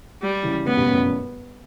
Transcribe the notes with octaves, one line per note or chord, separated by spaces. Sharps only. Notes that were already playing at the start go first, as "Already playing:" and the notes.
G3
C#3 E3
A2 C#3 B3
G2 B2
F#2 A2
F#2 A2